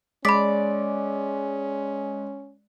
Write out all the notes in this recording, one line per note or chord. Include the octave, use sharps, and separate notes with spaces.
G#3 C#4 D5 B5 B6